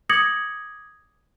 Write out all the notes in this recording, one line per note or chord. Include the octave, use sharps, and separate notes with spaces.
D6 D#6 G#6 A#6 C#7 F#7